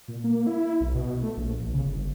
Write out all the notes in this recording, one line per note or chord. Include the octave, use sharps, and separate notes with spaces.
A#2
A#3
E4
B1
B2
A3
A#1
A#1
C#3
G1